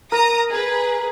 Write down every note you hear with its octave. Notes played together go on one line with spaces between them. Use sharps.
A#4 A#5 D#6
G#4 B4